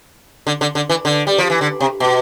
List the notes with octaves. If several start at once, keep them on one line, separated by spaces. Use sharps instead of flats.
D3
D3
D3
E3
D3
G3
F3
E3
D3
C3
B2